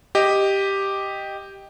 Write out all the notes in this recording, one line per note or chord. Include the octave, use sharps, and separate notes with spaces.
G4 D#5